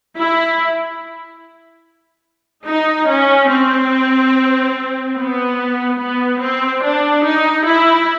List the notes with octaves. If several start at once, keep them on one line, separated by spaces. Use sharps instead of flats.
E4
D#4
C#4
C4
B3
B3
C4
D4
D#4
E4